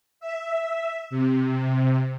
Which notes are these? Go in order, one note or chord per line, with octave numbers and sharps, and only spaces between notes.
E5
C3